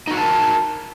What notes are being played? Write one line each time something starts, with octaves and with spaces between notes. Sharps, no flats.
D#4 F#4 A#4 F#5 A5